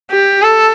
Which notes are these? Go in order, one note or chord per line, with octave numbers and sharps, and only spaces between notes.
G4
A4